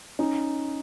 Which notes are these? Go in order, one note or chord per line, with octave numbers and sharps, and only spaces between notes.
C#4 D#4